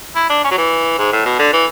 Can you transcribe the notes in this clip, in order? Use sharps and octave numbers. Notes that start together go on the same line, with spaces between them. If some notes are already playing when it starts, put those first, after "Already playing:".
E4
D4
C#4
F#3
E3
G#2
A2
B2
D3
E3